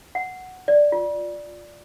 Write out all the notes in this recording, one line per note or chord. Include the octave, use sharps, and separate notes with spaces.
F#5
D5
F4